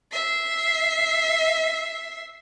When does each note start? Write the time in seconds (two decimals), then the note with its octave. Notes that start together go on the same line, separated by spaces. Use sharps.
0.11 E5 C7